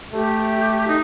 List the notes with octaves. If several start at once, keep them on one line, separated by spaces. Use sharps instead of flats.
A3 G4
D#4